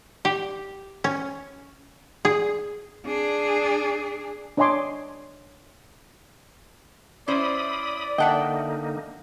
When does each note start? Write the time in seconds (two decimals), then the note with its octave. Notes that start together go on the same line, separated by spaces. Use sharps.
0.25 G4
1.04 C#4
2.25 G#4
3.06 D4 G#4
4.57 D4 C#5 D#5 G#5 C6 D6
7.28 C#4 E4 C5 D5 B5 D#6
8.18 D3 A#3 D#4 D#5 E5 F#5 G5 A5